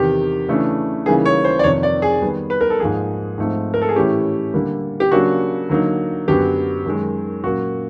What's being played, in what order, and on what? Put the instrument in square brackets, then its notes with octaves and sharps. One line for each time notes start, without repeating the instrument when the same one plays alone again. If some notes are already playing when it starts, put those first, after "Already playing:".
Already playing: [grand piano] E2 C3 D#3 G4
C#3 E3 A3 D4
C#3 E3 G3 A#3 D#4 G#4
C#5
C5
D5
F2 C3 D#3 C#5
D5
G#4
D#3 G3 B3
B4
A#4
A4
G#2 F3 A#3 G#4
G#2 F3 A3 C4 D#4
A#4
A4
G#4
A2 E3 A3 C#4 G4
D3 G3 A#3
G4
C#3 F#3 A#3 D4 F#4
D3 F#3 A#3 D#4
F#2 D3 F#3 B3 G4
F#2 D#3 G#3
A#2 F#3 A#3 C#4 F#4